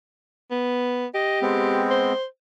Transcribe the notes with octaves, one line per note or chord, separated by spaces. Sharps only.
B3
G4 D#5
G#3 B3 C4
C5